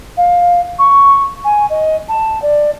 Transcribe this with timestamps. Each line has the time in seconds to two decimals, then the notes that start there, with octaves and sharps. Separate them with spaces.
0.17 F5
0.79 C#6
1.44 G#5
1.70 D#5
2.09 A5
2.42 D5